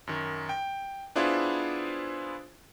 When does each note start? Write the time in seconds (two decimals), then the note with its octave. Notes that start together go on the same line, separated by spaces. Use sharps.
0.07 F#2 D#3
0.49 G5
1.16 B3 D4 E4 F4 G#4 C5